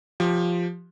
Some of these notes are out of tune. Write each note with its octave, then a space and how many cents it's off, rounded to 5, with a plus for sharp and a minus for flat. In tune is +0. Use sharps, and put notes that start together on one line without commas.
F3 +0 G4 +0